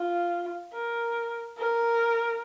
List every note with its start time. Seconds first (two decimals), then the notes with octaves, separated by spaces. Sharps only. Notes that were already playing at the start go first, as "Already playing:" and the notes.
Already playing: F4
0.73 A#4
1.58 A#4